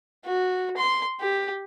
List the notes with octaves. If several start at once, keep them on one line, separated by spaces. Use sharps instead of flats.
F#4
C6
G4